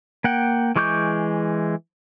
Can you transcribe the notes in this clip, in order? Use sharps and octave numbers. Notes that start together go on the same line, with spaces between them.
A#3 F#5 G5
E3 G#3 C#6 D6 G6